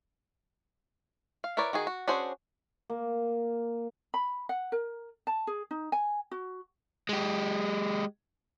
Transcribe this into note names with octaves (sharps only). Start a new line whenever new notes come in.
F5
E4 A#4 B4 C#5 D5
D#3 F#4 G#4
F#4
C#4 D4 F#4 G#4 C5
A#3
B5
F#5
A#4
A5
G#4
D#4
G#5
F#4
G#3 G4